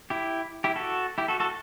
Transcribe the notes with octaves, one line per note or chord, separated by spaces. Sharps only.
E4 G4
E4 G4
F#4 A4
E4 G4
F#4 A4
F#4 A4